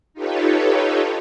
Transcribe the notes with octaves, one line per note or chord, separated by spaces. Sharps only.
D#4 F4 G4 A4 B4 C#5